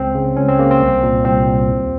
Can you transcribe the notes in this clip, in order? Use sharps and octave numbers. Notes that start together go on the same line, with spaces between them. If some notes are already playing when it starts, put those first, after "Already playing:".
Already playing: C#2 C4
C#3
C#2 C#4
C4
C#3 A#3
C4
C2
A#2
C2 C4
A#2
D#2